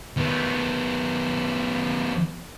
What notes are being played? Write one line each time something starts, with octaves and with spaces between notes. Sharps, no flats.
D#3 B3